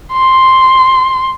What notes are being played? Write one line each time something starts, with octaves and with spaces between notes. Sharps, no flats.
C6